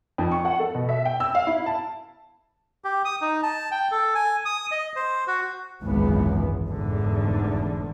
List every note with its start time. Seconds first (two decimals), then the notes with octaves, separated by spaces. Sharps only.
0.18 F2
0.32 C#6
0.45 F#5
0.60 A4
0.75 B2
0.89 E5
1.05 G5
1.20 E6
1.35 F5
1.47 E4
1.66 A5
2.85 G4
3.05 D#6
3.21 D#4
3.43 A5
3.71 G5
3.92 A4
4.15 G#5
4.45 D#6
4.71 D#5
4.96 C5
5.27 F#4
5.82 G#1 C#2 F#2 E3 G#3 B3
6.67 F1 E2 G#2 D3